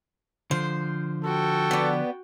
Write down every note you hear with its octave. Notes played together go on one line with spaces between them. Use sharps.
D3 F3 C5
F#4 A4 G5
B3 D5